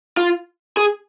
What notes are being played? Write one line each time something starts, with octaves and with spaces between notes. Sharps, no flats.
F4
G#4